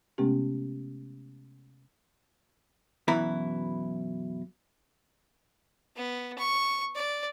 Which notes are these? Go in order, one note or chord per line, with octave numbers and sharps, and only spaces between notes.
C3 G#3 A3 B3 C#4 G4
F#2 B2 E3 E4 B4 A#5
B3
C#6
D5